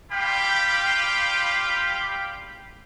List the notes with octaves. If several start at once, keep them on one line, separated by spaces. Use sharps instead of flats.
G3 F4 G4 F5 G5 B5